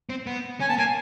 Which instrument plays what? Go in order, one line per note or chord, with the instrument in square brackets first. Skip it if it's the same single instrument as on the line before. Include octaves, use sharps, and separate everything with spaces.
[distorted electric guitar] C4
B3
[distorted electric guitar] C#4 [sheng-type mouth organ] G#5
[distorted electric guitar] B3 [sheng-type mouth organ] A5
[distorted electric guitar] A#3 [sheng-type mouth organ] G#5